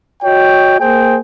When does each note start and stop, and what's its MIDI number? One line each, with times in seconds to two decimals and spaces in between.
0.23 0.80 66
0.23 0.80 73
0.23 0.80 75
0.23 0.80 79
0.80 1.18 58
0.80 1.18 68
0.80 1.18 72
0.80 1.18 79